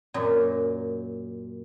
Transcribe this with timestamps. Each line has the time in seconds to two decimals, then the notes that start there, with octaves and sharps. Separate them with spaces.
0.14 F#2 A#2